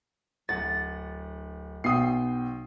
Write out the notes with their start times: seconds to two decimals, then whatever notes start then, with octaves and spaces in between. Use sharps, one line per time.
0.49 D1 F#5 A6
1.84 B1 G5 D#6 C7